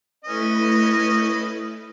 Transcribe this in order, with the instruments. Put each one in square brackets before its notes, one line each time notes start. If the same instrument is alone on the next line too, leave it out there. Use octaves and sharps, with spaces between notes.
[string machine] A3 E4 B4 [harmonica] C#4 D#5